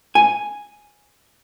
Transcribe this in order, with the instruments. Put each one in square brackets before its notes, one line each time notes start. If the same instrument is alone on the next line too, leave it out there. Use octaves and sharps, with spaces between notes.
[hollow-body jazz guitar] G#5